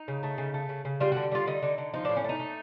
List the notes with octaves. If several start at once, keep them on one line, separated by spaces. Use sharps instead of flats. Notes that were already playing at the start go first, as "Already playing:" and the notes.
Already playing: D#4
C#3
A3
C#3
A3
C#3
C#3
G3 F4
D3 F#4
G3 F4
D3 D#4
D3
D3
F3 D#4
A2 D4
C#4
A3 D#4
A3